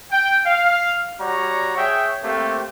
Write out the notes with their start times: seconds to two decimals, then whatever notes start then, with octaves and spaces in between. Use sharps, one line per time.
0.12 G5
0.46 F5
1.20 G3 F#4 C#5 D5 A#5
1.78 G#4 C#5 E5 G5
2.24 A3 A#3 C4 G4